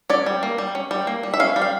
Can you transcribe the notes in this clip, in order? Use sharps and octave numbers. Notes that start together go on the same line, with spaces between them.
C#4 D5
G3
A#3
G3
C#4
G3
A#3
G3
E5
C#4 F5
G3
F5